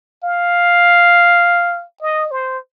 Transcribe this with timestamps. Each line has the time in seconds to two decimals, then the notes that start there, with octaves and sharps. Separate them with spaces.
0.24 F5
2.02 D#5
2.31 C5